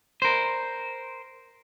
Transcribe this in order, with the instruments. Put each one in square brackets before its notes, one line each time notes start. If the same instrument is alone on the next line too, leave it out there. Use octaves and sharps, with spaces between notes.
[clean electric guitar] A#4 C5